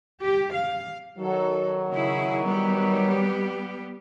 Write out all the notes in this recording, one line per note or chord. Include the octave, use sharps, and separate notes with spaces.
G4
F5
D#3 F#3 A4
C#3 E4 G#4
G3 B3 G4